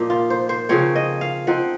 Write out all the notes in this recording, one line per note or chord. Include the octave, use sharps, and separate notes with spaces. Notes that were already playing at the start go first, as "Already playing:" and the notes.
Already playing: A#2 F3 A#3 D#4
F4
C5
C5
C#3 F3 C4 C#5
D#5
F5
F3 C4 D#4 F#5